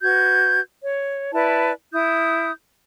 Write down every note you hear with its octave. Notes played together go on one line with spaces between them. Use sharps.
F#4 B4 G6 G#6
C#5
E4 B4 D5 A5
E4 D#6 G6